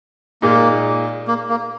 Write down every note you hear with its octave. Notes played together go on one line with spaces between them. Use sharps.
A#2 G#3 A#3 D#4
A#3
A#3